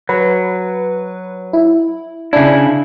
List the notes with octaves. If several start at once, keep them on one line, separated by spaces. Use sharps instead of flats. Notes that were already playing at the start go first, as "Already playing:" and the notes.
F#3 B4
E4
C#3 D4 E4